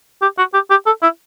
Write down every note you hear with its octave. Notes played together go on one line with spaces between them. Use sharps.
G4
F#4
G4
G4
A4
E4